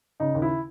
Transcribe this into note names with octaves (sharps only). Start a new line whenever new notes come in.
C#3 D#4
D#2
E4